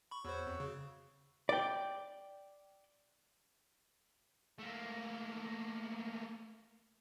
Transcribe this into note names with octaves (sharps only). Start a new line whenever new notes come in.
B5 C#6
E2 F#4 C5 C#5 E6
F2
C#3
D5 G5
A3 A#3